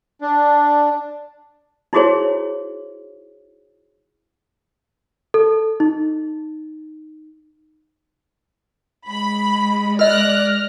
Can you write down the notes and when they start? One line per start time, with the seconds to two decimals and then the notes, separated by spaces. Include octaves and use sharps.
0.21 D4
1.93 D#4 E4 F#4 G#4 C5 C#5
5.34 A4
5.80 D#4
9.07 G#3 B5
9.99 A#4 D5 D#5 F6 F#6 A#6